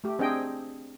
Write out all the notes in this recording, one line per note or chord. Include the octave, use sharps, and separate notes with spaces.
A3 G4
C4 D4 G#4 D#5 G5